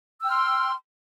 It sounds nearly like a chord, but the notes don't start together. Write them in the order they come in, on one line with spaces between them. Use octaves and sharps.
E6 G5 F6 C6